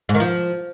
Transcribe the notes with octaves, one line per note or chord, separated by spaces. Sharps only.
G#2
D#3
F3